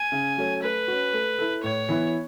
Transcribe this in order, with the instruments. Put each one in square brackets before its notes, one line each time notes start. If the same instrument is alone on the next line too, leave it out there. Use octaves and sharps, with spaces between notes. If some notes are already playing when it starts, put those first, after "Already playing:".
Already playing: [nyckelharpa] G#5
[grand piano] C#3
F#3 A3 C#4
[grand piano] A3 [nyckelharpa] B4
[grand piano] C#4 F#4
A3
E4 A4
[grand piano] A2 [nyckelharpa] C#5
[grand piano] E3 B3 E4 B4